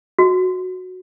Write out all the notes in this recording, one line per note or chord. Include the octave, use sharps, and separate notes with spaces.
F#4